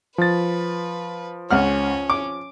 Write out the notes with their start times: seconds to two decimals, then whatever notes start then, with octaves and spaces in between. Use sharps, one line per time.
0.18 F3 B4 A6
1.51 C#2 C#4 F#5 F6
2.10 D6